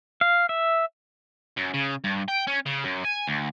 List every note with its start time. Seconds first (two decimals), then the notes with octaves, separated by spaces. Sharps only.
0.21 F5
0.49 E5
1.57 F#2
1.74 C#3
2.04 G2
2.28 G5
2.47 C#4
2.66 C#3
2.84 F#2
3.05 G#5
3.27 D2